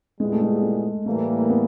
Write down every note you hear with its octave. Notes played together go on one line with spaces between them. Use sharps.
A#2 G3 G#3 B3 E4 G#4
A3
G#3
A3
A2 E3 G3 A3 A#3
B3